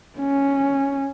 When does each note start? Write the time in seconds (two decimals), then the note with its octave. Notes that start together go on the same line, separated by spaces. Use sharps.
0.19 C#4